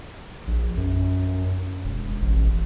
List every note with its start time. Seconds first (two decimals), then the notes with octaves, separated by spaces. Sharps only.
0.47 A#1
0.77 F#2
1.84 E1
2.22 A1